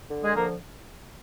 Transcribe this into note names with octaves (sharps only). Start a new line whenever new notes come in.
D3
G#3 G#4
F3 A#3 A#4